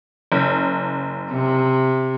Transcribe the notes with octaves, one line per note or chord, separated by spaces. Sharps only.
F#1
C3